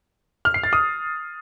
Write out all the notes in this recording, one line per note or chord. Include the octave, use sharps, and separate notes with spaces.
F6
C7
A6
D#6